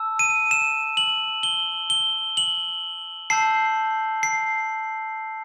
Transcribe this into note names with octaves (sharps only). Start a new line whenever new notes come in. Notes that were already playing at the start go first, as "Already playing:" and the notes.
Already playing: A5 E6
D#7
E7
F#7
G7
G7
F#7
A5 E6 G6 C7
C7